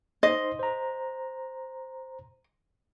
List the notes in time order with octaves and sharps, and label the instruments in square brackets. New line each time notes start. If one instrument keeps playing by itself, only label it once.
[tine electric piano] D#4 C5 C6 [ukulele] D#5
[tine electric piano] C5 A#5